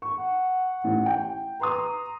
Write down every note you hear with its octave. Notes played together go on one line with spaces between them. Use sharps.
C#6
F#5
A1
G5
B4 A#5 C6 D#6